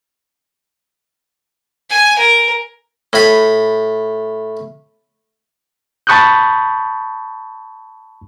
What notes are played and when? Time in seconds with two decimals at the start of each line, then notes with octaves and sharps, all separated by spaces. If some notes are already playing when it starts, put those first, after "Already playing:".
1.90 G#5
2.18 A#4
3.13 A2 B5
6.07 A5 B5 C#6 D#6 F#6 G6